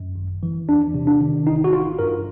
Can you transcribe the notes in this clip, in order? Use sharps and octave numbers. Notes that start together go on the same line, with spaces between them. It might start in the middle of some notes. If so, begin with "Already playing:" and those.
Already playing: F#2
G#1
E3
E2 D4
C3
D4
D#3
A1 D#4
F#4
A1 F4
G2 A#4